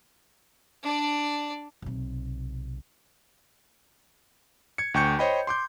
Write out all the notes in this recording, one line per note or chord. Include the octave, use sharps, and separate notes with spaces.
D4 D5
B1 C3
G#6 C#7
D2 G5 C#6 G6 C#7
C5 C#5 D#5 G5 B5
C6 D6 G6